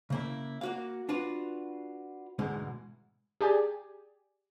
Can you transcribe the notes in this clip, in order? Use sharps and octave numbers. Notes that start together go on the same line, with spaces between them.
C#3 A#3 E4
A#3 F#4 F5
D4 F4 F#4 B4
D2 G#2 B2 E3 G#3
G4 G#4 D5 G#5